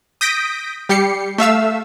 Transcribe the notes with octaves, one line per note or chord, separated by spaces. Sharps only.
D#6 G6 A#6 B6 D7
G3 G4 C7 C#7
A3 E5 F5 E6